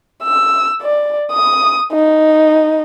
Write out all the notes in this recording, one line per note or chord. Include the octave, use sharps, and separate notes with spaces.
E6
D5
D#6
D#4